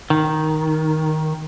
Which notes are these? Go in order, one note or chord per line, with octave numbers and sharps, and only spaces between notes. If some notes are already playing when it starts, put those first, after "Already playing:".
D#3